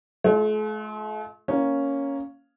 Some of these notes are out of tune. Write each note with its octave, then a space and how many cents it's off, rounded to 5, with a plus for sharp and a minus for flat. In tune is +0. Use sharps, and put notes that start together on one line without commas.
A3 -45 F4 +0
A#3 +0 C#4 +0 F5 +0